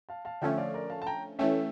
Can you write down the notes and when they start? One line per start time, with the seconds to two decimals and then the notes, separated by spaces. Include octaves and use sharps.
0.09 F5 A5
0.25 F5 A5
0.42 D3 F3 A3 C#4 E5 G5
0.58 D5 F5
0.74 A#4 D5
0.90 F5 A5
1.02 A5
1.06 G5 A#5
1.39 E3 A3 C#4 E5 G5